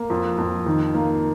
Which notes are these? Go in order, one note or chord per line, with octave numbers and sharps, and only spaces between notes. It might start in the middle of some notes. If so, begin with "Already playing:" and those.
Already playing: A#3
F2
F2
D#3
A#3